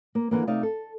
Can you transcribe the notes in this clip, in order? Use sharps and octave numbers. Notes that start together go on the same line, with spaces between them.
A#3
D3 E3 A#3
C3 A3 D#4 D5 E5 F5
A4